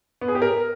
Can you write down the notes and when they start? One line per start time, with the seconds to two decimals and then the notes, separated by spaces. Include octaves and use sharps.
0.21 B3
0.28 G#4
0.35 G4
0.42 A#4